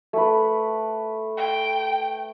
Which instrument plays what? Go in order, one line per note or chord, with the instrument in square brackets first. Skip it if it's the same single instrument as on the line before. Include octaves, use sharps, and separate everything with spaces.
[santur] A3 B4
[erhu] G5